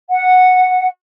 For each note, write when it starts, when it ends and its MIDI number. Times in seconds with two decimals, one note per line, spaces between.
0.09 0.87 78